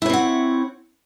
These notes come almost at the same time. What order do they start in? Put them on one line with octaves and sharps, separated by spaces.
E4 C#5 C4 F#5